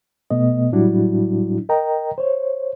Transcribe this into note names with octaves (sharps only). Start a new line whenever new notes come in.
B2 A3 B3 D#5
A2 F#3 G3 D4 E4 F#4
A#4 D#5 G5 A#5
C5 C#5